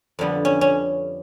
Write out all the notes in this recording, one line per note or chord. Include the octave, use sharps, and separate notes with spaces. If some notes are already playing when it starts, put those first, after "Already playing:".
F2 D3 G3 B3
C#4
C#4